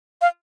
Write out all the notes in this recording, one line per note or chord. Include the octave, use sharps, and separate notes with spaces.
F5